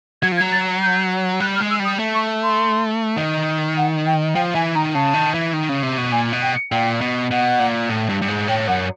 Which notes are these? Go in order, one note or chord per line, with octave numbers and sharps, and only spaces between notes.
F#3 G#6
F3
G#6
F#3
A6
G6
G3 F#6
F6
G#3
E6
G3
D#6
A3
C#6
C6
D#3
F#5
G5
F3 G5
E3 G#5
D#3 A#5
C#3 A5
D#3
E3
D#3
C#3
C3
B2
A#2 G#5
B2
G5
A#2 G5
B2
B2 F#5
A#2
A2
G2
G2
G#2
A2 G5
F#2 F#5